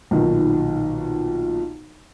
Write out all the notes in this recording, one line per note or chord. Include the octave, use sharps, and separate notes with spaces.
B1 A#2 D#3